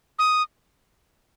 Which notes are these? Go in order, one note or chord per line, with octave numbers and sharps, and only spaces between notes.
D#6